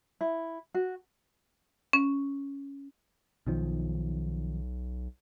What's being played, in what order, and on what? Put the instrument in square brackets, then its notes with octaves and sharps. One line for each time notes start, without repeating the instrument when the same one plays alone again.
[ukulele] E4
F#4
[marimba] C#4
[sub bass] B1 [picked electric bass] B2 D#3 F3